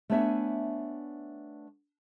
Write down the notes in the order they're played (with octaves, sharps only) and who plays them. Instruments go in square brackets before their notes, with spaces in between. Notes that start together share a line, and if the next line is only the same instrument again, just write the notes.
[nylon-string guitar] A3 B3 D4 C#5 E5 G#5